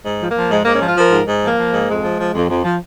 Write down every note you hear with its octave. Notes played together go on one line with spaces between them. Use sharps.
G#2
F3
A#3
F3
G#2 G#3
G#2 A#3
C#4
F3 F4
F3 A#4
G#2
G#2
F3 A#3
F3
G#2
F2 G#3
F3
F3
F2
F2
F3